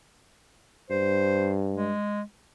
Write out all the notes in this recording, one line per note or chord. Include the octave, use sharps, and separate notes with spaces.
G2 C5
G#3